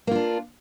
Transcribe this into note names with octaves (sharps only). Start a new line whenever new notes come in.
A#3 D4 F4